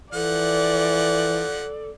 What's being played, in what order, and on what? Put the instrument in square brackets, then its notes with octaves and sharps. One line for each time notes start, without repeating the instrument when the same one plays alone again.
[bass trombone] E3 [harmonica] F3 F#5 [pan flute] A4 [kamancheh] D5